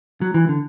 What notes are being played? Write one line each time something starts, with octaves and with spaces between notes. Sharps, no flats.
F#3
E3
D3